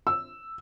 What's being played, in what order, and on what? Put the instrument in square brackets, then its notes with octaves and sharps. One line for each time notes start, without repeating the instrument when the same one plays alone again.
[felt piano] E6